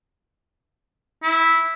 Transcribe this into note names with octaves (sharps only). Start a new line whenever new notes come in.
E4